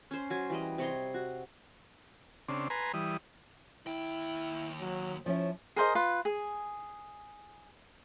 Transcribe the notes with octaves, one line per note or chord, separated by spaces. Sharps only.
C#4 C5
F#3 G#5
E3 G3 D#5
C3 C#5 D#5 C6
F#4
C#3 C4 D4
B4 G#5 A#5 C6
E3 G3 D#6
D#2 E4 G5
F#3
F3 C#4 E4 C#5
G#4 A#4 C5 D#5
F4 B4
G#4